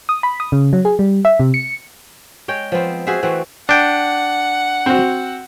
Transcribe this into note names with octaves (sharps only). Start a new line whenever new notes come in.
D#6
B5
D#6
C#3
F#3
G#4
G3
E5
C3
C#7
G#3 C#5 G5
F3 B3 C4
F#4 G#4 C5 E5
E3 A3 C4 F#4
D4 F#5 G5
C4 F#4